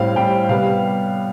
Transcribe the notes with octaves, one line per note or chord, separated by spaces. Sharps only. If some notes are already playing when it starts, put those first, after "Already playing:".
Already playing: A2 G3 C4 F5
A2 G3 C4 G5
C3 G3 B3 F5